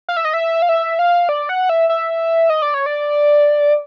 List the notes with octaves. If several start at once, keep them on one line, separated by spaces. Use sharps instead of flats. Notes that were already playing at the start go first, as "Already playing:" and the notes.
F5
E5
D#5
E5
F5
E5
F5
D5
F#5
E5
E5
D#5
D5
C#5
D5